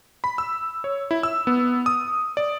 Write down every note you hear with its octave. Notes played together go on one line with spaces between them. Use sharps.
B5
E6
C#5
E4
E6
B3
D#6
D5